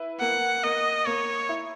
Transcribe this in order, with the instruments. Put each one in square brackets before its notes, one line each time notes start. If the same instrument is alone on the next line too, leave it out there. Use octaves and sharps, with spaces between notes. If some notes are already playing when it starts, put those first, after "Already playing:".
Already playing: [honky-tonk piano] E4 B4
[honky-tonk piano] A#3 [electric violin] F#5
[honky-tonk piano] A#3 [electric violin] D#5
[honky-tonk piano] A#3 [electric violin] C#5
[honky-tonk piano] E4